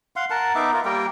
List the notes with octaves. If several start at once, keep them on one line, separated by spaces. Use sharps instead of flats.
F5 F#5 C6
A#4 F#5 A5
B3 D#4 E5 D6
F4 A#4
G3 A#3 A#4 G5